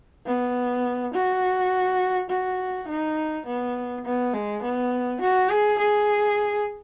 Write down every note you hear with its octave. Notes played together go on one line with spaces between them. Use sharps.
B3
F#4
F#4
D#4
B3
B3
G#3
B3
F#4
G#4
G#4